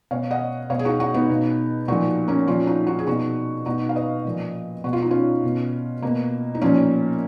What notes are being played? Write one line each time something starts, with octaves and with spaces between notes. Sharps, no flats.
B2 C#5 F5
D#5 F#5
B2 C#5 F5
G#4
D#4 F#4
D#4 F#4
B3 D#4
B2
A#2 F3 D#4 F#4
A#3 C#4
A#2 F3 C#4 F4
D#4 F#4
D#4 F#4
G#4
B2 D#4 F#4
B2 D#4 F#4
F5
B4 D#5
A#2 F3
B2 F#4
F4
D#4
C#4 F4
B2
B2 A#3
D#4
A#2 F3 A#3 C#4